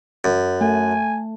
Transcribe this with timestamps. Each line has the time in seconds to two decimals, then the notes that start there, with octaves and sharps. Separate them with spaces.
0.24 F#2
0.61 A3 G#5